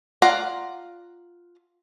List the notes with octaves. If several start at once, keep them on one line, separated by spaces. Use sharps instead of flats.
F4 D5 F5 F#5 A#5